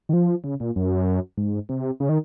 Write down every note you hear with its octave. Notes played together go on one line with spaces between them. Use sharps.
D#3
F3
C#3
A#2
F#2
G#2
C3
C#3
D#3